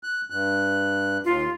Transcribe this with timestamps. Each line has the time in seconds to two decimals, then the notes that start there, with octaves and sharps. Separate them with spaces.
0.03 F#6
0.30 G2 F#6
1.25 D#2 F4